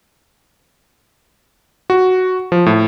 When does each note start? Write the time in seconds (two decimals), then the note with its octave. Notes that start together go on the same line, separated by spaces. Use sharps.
1.90 F#4
2.52 F3
2.66 A2